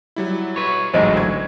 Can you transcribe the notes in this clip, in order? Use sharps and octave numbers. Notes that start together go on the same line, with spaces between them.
F#3 G3 E4
B4 C#5
A1 D2 G#2 D3 F#3 C5 D#5 A5
G#6